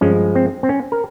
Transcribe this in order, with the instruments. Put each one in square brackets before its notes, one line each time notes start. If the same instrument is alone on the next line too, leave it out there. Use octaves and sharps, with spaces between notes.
[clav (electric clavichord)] G2 F3 G#3 C#4
C4
C4
C#4
A#4